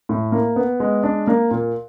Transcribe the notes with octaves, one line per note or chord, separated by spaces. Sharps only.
A2
A#3
B3
G#3
D4
A#3
A#2